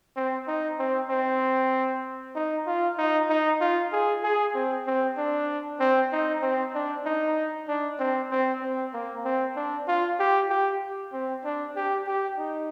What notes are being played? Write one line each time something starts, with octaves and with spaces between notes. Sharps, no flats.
C4
D#4
C4
C4
D#4
F4
D#4
D#4
F4
G#4
G#4
C4
C4
D4
C4
D#4
C4
D4
D#4
D4
C4
C4
C4
A#3
C4
D4
F4
G4
G4
C4
D4
G4
G4
D#4